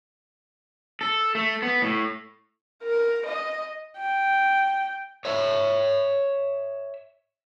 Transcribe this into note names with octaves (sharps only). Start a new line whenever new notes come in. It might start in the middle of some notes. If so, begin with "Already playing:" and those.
A4
A3
B3
A2
A#4
D#5
G5
C#5 E5